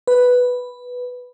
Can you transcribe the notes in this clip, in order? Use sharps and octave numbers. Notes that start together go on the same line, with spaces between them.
B4